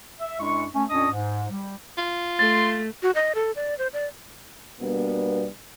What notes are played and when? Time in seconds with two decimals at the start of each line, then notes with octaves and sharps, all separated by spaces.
0.20 E5
0.40 F#2 G#3 D4 E4 C#6
0.75 A3 C#4
0.90 F2 A#2 C#4 D4 D#5 D#6
1.12 G#2
1.50 G3
1.97 F4
2.39 A3 C6 A6
3.03 F#4
3.15 D#5
3.35 A4
3.56 D5
3.78 C5
3.93 D5
4.80 B2 G3 A#3 B3 D4